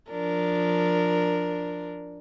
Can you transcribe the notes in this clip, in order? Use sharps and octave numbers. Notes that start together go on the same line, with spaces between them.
F3 D4 A#4